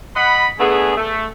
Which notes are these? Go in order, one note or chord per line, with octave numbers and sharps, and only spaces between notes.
D#5 F#5 B5
A3 B3 D4 G#4
A3